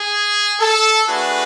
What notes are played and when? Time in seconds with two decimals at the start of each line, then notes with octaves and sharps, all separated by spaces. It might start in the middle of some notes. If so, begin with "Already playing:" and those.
Already playing: G#4
0.60 A4
1.07 A3 D4 F#4 G#4 B4